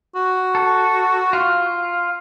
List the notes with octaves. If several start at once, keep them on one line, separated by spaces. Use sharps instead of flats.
F#4
A4
F4